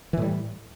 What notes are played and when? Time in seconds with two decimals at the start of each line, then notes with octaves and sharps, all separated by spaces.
0.13 E3
0.17 A2
0.22 G3